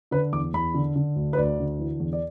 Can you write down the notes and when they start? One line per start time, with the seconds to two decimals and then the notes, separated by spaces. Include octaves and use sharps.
0.11 D3 B4
0.33 E2 D6
0.54 E2 B5
0.74 D3
0.96 D3
1.16 D2
1.33 B4
1.37 D2 D5
1.59 D3
1.79 E3
2.00 E2
2.13 D5